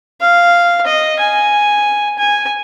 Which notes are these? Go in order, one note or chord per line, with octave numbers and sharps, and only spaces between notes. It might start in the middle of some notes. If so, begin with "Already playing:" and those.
F5
D#5
G#5
G#5